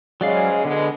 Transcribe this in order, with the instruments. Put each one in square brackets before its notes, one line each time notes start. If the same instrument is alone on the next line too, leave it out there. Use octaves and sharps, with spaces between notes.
[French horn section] G#2 C#3 G#3 [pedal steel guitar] F#3 D5 F5
[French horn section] B2 G#3 B3 [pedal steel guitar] D3